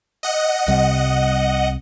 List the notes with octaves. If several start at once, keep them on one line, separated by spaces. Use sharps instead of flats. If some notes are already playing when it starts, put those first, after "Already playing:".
D#5 F#5
C2 C3 G3